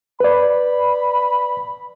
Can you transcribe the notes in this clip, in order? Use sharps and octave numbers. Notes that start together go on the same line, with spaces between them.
B4 D5 B5